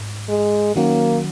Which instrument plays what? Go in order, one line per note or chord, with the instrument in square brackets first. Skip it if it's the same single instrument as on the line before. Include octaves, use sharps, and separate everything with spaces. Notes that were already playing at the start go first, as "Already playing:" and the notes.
Already playing: [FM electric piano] G#2
[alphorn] G#3
[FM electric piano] D#3 F#3 C#4 F#4 [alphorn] A#3